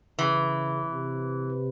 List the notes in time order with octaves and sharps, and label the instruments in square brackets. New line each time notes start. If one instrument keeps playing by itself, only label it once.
[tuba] C#3 [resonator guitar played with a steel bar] E3
[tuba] C3